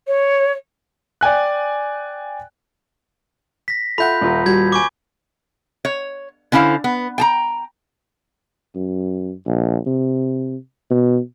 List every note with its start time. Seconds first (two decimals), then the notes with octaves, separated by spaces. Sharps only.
0.08 C#5
1.21 D5 G5 G#5 F#6
3.68 A#6 B6
3.98 F4 A4 E5 F#5 B5 G6
4.21 D#1 F4 A#5
4.46 G3 F#4 G#6
4.72 G#5 C#6 D6
5.85 C#5
6.52 D3 C#4 E4 C5 F5
6.84 B3
7.18 G5 A5 A#5
8.75 F#2
9.46 A#1
9.86 C3
10.90 B2